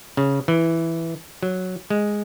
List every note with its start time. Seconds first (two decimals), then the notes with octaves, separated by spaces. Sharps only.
0.17 C#3
0.48 E3
1.43 F#3
1.90 G#3